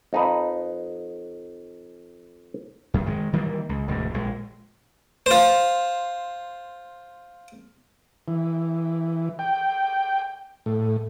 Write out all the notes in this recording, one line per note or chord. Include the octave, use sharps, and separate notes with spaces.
F2 D#4 B4
F#2
D#3 G#3
D#3 E3 G3 A#3
C#2
E1 D2 G#2
A#1 G#3
F4 C5
E3
G5
A2